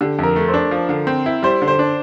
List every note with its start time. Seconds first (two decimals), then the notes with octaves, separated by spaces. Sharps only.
0.01 D3 G4
0.19 F2 A#4
0.36 A3
0.48 C5
0.54 D4
0.71 F3
0.89 D3
1.07 C4
1.26 E4
1.43 G3 C5
1.62 D3
1.68 C5
1.79 D4